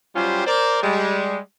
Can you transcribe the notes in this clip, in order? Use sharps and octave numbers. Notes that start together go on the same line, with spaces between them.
F#3 G3 C#4 F4 G4 C5
A#4 C5 D5
G3 G#3